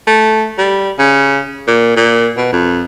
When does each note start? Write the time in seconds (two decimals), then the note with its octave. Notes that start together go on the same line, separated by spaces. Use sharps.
0.07 A3
0.58 G3
0.99 C#3
1.67 A#2
1.96 A#2
2.37 B2
2.52 F2